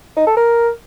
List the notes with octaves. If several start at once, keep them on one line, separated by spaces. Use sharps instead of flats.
D#4
A4
A#4